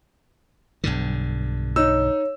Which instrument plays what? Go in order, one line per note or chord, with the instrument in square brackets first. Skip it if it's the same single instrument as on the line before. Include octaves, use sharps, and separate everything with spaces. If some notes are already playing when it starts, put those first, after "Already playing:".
[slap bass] B1 G2 D3
[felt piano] D#4 [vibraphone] C#5 [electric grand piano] E6